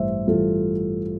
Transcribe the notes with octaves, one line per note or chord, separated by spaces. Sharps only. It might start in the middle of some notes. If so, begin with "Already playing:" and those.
Already playing: A1 G2 E3 G3 C5 E5
A1 G2 E3 G3 F4 A4